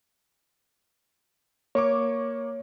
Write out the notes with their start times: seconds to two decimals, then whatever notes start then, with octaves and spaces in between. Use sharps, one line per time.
1.75 A#3 C#5 C#6 D6